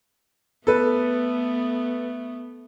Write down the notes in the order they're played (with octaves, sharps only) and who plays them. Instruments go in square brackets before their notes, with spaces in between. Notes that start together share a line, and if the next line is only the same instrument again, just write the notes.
[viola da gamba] A3 B3 [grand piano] A4 B4